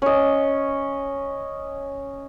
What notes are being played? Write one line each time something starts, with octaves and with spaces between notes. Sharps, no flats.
C#4 D#5